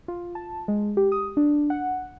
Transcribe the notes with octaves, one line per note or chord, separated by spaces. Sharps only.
F4
A5
G#3
G4
D#6
D4
F#5